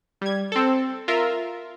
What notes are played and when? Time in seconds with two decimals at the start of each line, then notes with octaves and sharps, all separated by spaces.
0.21 G3 G#6
0.52 C4 A4
1.08 F4 A#4 E5